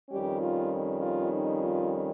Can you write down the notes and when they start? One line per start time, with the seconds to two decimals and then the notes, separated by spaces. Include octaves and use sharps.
0.10 F2 D#3 G3 C#4 G4
0.41 F4
1.01 F4
1.32 D#4
1.62 F4